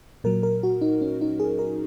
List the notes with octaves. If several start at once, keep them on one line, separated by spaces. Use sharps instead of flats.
A#2 F#3 A#4
A#4
F#4
D#4
C#4
D#4
G#4
A#4